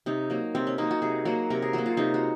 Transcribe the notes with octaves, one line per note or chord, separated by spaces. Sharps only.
C3 D#4
F#3 A#3
C3 C4
C#4
F#3 A#3 D#4
F#4
C3 G#4
F#3 A#3 F#4
C3 A#4
G#4
F#3 A#3 F#4
F4
C3 D#4
F#4